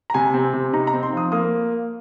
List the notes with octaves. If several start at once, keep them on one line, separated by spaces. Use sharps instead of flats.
A#5
C3 G#5
C4
C3
D#4 A#5
A#5
C4
C6
F3 D#6
A#3 D#6